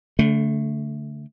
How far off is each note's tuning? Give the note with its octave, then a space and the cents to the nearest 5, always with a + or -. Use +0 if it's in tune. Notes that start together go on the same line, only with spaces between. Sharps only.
D3 -30 A3 +0